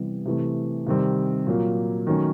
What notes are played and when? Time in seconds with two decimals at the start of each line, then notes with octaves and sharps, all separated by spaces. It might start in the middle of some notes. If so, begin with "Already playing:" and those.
Already playing: C3 E3 G3 B3
0.25 C3 E3 A3
0.86 C3 D#3 G3 C4
1.47 A#2 F#3 A#3
2.07 D#3 F#3 A3 C#4